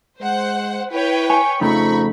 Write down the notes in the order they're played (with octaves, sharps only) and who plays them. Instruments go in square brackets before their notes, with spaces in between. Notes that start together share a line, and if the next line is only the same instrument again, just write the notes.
[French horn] G#3 [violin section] C5 F#5
[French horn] E4 [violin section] B4 C#5 G5
[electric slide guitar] G#5 [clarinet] C#6
[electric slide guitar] F2 C#3 A3 [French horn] F3 [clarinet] D#4 [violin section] B5 C#6